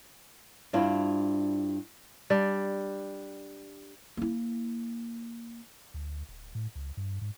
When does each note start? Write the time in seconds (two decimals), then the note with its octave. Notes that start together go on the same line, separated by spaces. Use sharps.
0.73 G2 C4 D4 E4 F4
2.30 G3 D4
4.17 A#3 E4
5.94 D2
6.29 D1
6.55 A2
6.75 C#2
6.97 G2
7.21 G#2